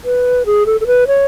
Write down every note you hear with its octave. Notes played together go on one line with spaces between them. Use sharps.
B4
G#4
A4
A4
B4
C#5